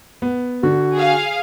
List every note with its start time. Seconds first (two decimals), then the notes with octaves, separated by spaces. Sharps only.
0.22 B3
0.63 D3 F#4
0.95 G#4 F5